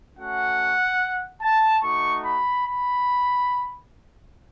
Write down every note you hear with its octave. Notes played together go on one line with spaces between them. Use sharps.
A3 C#4 F#4 F#5
A5
A3 D#4 F#4 C#6
B5
B5